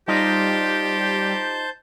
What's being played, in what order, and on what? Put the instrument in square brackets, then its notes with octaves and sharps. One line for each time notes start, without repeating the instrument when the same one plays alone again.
[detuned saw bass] G3 [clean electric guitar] D#4 F4 D#5 [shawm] G4 [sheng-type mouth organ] C5 A5 G6